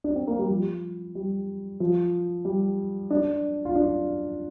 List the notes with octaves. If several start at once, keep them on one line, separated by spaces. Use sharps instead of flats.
D4
C4
A#3
G3
F3
G3
F3
G3
D4
F4
D4